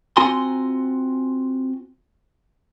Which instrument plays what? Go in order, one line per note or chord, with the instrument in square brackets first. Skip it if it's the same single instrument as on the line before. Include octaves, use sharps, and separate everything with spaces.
[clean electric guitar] C4 F4 F#4 G#5 A#5 C6